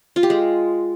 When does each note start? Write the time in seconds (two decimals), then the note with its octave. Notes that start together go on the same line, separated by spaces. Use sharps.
0.16 F4
0.23 G4
0.30 G#3